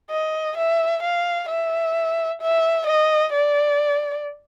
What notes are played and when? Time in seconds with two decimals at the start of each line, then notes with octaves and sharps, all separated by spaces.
0.11 D#5
0.57 E5
1.03 F5
1.49 E5
2.42 E5
2.87 D#5
3.33 D5